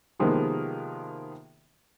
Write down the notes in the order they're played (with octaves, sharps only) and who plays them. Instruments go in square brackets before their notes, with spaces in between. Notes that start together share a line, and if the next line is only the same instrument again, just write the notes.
[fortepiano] C3 D#3 F3 G#3 A#3 B3